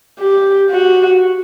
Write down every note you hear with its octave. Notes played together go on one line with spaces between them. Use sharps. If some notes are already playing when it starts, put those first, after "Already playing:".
G4
F#4